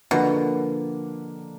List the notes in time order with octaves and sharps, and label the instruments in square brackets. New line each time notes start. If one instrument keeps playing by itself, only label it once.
[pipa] B2 [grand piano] D3 F3 A#3 D4